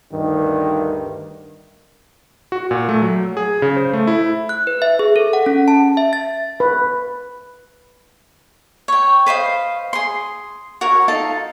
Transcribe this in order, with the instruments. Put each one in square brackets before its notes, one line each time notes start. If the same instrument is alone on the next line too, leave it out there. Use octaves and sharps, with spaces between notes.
[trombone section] D2 G2 D#3
[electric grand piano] F#4
A#2
A3
F#3
G#4
C#3
C5
A3
E4
[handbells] F#6
B4
E5
G#4
A4
F#5
C#4
A5
E5
A6
[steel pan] B4
[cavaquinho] C#5 G5
B4 C5 D#5 F5
G#4 C6
F#4 A#4 C#5
D#4 F4 A4 A5